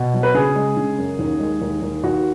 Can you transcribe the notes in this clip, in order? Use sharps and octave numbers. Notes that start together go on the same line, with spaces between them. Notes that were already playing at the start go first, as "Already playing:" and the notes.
Already playing: B2
F#3
B4
C#3 G#4
G#3
C#3
F#2
D#2
G#3
D#2
D#2
D#2 F#4